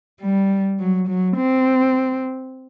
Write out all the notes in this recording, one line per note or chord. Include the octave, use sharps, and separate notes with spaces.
G3
F#3
F#3
C4